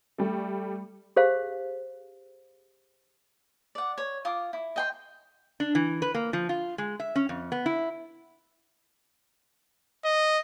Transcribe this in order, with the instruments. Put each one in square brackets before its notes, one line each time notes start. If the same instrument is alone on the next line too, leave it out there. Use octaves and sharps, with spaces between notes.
[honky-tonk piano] G3 A3
[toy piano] G4 G#4 C5 F5
[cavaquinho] D5 F#5
C#5
F4 D6 D#6
E4
D#5 G5 C6
[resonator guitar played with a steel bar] D4
E3
B4
A#3
F3
F4
G#3
E5
C#4
F2
B3
E4
[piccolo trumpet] D#5